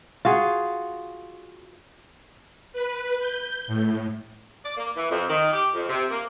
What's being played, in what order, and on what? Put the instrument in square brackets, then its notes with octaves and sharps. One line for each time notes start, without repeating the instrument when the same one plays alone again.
[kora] F4 F#4 G#4
[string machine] B4
G6
A2
[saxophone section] D5
A#3
E3
F2
D#3
G4
F2
C3
A#3